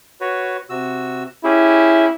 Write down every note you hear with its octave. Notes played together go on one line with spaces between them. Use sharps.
F#4 B4 C#5
C3 F#4 E6
C#4 E4 G4 G#4